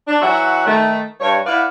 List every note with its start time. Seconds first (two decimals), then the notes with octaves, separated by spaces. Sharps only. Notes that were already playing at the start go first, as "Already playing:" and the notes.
0.08 D4
0.22 E3 F#3 F#4 E5 F#5
0.67 D#3 A3
1.21 G2 C#5
1.46 E4 B4 D5 F5 F#5